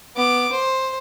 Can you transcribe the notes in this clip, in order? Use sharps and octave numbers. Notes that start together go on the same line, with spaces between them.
B3 D6
C5